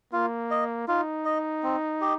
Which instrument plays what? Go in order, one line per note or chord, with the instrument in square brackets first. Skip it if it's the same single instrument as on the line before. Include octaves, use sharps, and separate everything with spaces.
[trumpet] A#3 [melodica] F4
[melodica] D#5
[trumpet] D#4 [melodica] F4
[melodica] D#5
C4
G4 D#5